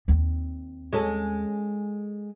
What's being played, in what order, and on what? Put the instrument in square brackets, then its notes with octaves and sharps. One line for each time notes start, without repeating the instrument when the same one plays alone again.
[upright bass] D#2 C4
[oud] G#3 C#4 A4